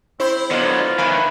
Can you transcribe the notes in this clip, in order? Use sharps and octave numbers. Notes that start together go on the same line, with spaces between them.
C4 E4 C5
D3 F#3 B3 F4 D5 D#5
D#3 E3 B4 F5 G#5